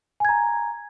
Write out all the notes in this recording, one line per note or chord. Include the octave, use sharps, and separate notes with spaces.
G#5 A#5 G#6